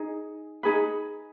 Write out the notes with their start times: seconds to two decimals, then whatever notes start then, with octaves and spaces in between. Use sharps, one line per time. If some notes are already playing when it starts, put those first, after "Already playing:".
Already playing: D#4 G#4
0.63 D#4 G#4 B4